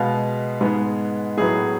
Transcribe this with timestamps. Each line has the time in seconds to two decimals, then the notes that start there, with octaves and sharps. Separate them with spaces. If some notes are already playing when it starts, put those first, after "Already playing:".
Already playing: B2 G#3 B3 F5
0.61 G#2 G#3 B3
1.37 A2 F#3 B3 G#4